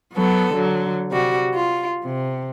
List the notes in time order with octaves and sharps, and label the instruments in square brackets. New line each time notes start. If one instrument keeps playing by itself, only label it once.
[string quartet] F#3 B3 A4
D3 F#3
C3 G3 F#4
F4
C3